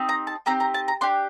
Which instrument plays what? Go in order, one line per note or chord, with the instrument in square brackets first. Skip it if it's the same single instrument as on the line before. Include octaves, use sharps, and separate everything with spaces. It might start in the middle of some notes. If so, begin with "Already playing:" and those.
Already playing: [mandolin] C4 D#4 G4
A#5
A5
C4 D#4 G4 A#5
A#5
A5
A#5
D4 G4 C6